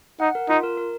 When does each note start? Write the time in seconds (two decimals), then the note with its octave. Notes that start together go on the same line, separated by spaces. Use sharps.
0.20 D#4 F#5
0.35 A#4
0.49 D#4 F4
0.63 A#4
0.77 A#4